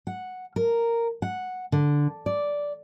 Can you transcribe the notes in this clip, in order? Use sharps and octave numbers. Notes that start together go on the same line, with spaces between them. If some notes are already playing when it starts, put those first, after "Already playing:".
F#5
A#4
F#5
D3
D5